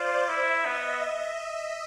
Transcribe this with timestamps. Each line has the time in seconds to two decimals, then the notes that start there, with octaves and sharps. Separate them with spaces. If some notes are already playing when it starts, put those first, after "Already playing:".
Already playing: F4 C5 D5
0.28 E4 E5
0.65 B3 D#5